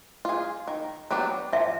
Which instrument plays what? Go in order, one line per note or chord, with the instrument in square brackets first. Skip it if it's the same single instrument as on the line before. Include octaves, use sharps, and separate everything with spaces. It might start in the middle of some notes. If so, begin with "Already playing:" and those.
[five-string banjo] F4 G#4
D#3
F#3 B3 D4 G4
[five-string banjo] F3 [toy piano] E5